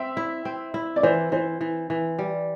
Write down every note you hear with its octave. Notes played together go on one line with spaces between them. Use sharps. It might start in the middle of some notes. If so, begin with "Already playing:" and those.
Already playing: C4 E5
E4
C4
E4
D5
E3 C5
E3 C5
E3
E3
G3